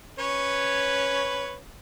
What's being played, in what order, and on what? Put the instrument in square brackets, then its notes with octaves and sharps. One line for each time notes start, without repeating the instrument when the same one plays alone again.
[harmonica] C#4 B4 C#5